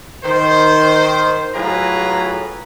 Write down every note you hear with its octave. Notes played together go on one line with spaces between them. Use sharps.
D#3 C5
A2 F#3 F4 G#4 B4 A#5